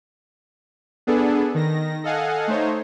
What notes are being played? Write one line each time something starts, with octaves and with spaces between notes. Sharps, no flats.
B3 D4 G#4 A4
D#3 A#6
A4 D#5 F5 F#5 G#5
A3 D#4 C5 C#5